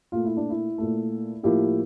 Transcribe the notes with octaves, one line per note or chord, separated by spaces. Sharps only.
A#2 A3 F4
E4
D4
E4
A#2 A3
A2 F3 A#3 E4 G4